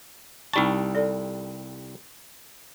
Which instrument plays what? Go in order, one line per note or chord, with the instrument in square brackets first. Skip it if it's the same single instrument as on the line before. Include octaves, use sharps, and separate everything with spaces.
[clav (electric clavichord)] C2 G3 A5 [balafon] D#4 C#6
[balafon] A4 D5